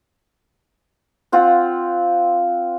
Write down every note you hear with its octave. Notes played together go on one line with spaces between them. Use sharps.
C4 F4 F#5